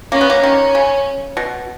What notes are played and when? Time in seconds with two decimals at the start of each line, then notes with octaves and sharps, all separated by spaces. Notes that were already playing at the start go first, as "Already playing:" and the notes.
0.12 A#3 C#4
0.21 B3
0.30 A#3
0.43 D#3 C#4
0.75 C#3
1.37 B2